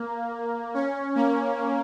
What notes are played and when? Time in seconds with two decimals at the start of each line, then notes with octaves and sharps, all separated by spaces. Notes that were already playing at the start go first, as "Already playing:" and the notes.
Already playing: A#3
0.74 C#4
1.15 A#3